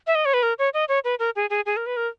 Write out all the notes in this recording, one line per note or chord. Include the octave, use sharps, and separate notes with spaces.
E5
D#5
C#5
B4
A#4
C#5
D#5
C#5
B4
A#4
G#4
G#4
G#4
A#4
B4
A#4